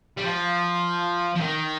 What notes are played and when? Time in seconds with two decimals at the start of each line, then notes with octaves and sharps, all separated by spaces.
0.17 G3
0.24 F3
1.35 F3
1.40 D#3